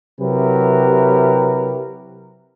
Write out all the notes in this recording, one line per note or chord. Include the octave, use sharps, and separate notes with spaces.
C3 F#3 E4 G4 A#4 B4